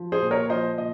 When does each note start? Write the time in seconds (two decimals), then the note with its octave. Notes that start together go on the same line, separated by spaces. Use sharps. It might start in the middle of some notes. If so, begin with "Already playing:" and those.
Already playing: F3
0.12 G#4 C5
0.22 A#2
0.31 A#4 C#5
0.50 F3 C5 D#5
0.77 A#2 D#5